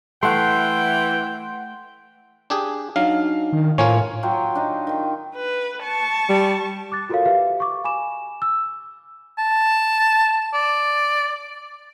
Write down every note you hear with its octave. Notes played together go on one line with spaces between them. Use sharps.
E3 A3 F#5 G5 C6
D4 G4 G#4
F#3 D4 D#4 F5
D#3
A2 F3 A#3 F4 C#5 G#5
F#3 F4 G5
D4 D#4
D#3 G5
B4
A5 C#6
G3
D6 F#6 A6
F4 F#4 A4 A#4 C#5 F5
G4 B4 E5 F5
C#6 D6
G#5 B5 D6 E7
E6
A5
D5